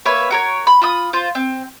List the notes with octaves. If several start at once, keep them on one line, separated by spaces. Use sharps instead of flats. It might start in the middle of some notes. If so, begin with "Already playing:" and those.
A#3 B4 C#5 E5
F#4 A#4 C#5
B5
F4 B5 D#6
F4 C5
C4